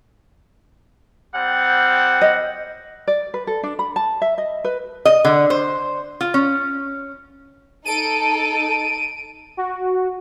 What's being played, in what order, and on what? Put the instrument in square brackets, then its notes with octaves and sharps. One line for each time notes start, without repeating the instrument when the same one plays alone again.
[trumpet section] G3 C4 F#5
[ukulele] D#5
D5
B4
A4
D4
B5
A5
E5
D#5
B4
[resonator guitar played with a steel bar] D#5
D3
C5
F4
C#4
[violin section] D#4 A4 [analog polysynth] D7 D#7
[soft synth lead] F#4